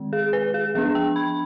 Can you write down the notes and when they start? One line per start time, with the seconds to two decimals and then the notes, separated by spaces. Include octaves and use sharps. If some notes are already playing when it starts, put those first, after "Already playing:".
Already playing: D#3 G#3 C4
0.13 G#4
0.33 B4
0.54 G#4
0.75 F3 B3 D4 G#4
0.95 G5
1.16 B5